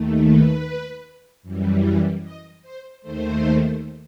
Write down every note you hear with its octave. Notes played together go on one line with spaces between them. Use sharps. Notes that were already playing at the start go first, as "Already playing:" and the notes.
Already playing: D#2 D#3 A3
B4
F#2 E3 G3
D#5
C5
D#2 D#3 A3 C5